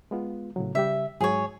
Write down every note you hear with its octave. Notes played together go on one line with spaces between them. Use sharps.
G#3 B3 F4
A2 C#3 F#3
C#3 G3 G4 E5
G#2 F#3 G#3 G#4 C#5